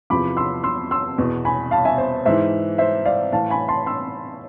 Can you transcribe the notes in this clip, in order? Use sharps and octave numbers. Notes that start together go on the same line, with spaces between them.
E2 C3 F3 B5 D6
C6 E6
C6 E6
C6 E6
E2 B2
G#5 B5
F5 A5
E5 G#5
C5
G#2 E3 C5 E5
C5 E5
D5 F5
A2 E3 F5 A5
G#5 B5
A5 C6
C6 E6